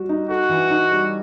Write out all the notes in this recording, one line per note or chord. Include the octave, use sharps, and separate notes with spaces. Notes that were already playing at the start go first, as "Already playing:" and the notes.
Already playing: G3 F#4
D#4
F#4 A4
E3
D#4
G3